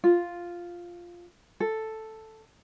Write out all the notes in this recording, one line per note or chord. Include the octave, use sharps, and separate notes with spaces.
F4
A4